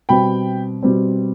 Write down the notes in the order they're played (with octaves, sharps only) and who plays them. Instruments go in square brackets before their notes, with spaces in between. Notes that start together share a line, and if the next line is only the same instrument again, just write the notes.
[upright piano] B2 G3 C4 G5 B5
B2 G3 C4